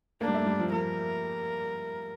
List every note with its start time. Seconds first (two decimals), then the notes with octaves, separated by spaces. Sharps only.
0.21 A#3 D4
0.28 G3
0.34 A3
0.46 G3
0.59 F3
0.72 F3 A#4